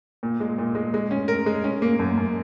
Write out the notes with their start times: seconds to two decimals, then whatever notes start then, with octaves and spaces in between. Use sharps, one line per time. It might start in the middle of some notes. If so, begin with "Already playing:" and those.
0.23 A#2
0.40 G#3
0.58 A#2
0.75 G#3
0.94 G#3
1.11 C#4
1.28 A#4
1.46 G#3
1.64 C#4
1.82 A#3
1.99 F#2
2.17 F#2